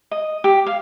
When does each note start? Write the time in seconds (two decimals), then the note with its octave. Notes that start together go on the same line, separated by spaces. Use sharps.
0.11 D#5
0.44 G4
0.66 F5